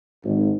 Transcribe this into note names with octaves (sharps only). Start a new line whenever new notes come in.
G#1